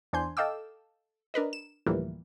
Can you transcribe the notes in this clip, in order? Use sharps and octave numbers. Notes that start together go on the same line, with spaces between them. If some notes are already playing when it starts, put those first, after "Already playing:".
E2 D4 C5 G#5 C6 G6
A4 D#5 F5 G5 D6 E6
D4 A#4 B4 D#5
E7
D2 A2 E3 F3 G3 A#3